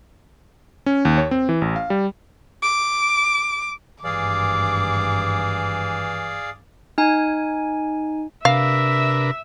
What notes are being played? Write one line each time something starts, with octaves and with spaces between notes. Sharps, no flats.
C#4
D#2
C#5
C4
E3
A1
F5
G3
D6
G#1 G2 E3 G#4 D5 F5 D6
D#4 G#5
C3 D4 A#4 B4 E5 F5